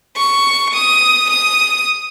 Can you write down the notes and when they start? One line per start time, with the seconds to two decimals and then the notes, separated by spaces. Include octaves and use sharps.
0.16 C#6
0.74 D#6
1.30 D#6